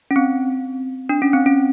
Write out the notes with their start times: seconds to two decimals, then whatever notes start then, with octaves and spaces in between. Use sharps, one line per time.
0.11 C#4
0.16 C4
1.09 D4
1.22 C#4
1.33 C4
1.46 C#4